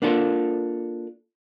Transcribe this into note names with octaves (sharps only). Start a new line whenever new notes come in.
A#3 D4 F4 A4